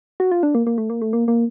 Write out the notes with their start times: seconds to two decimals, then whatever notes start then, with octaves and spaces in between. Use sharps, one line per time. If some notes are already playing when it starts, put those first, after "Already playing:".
0.20 F#4
0.32 F4
0.43 D4
0.55 A#3
0.67 A#3
0.78 A3
0.90 A#3
1.02 A3
1.13 A#3
1.28 A#3